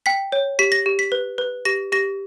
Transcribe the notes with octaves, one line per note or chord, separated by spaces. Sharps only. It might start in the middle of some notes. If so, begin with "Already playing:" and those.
G5 B6
C#5
G4 B6
A#6
G4
B6
B4
B4
G4 A#6
G4 A#6